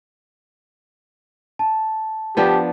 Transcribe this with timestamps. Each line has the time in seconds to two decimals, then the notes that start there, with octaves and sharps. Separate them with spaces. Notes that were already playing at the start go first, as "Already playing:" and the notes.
1.59 A5
2.37 F3 B3 D4 G4